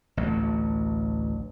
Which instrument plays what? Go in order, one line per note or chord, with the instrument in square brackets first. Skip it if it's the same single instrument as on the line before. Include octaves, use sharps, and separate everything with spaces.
[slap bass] A1 D2 F#3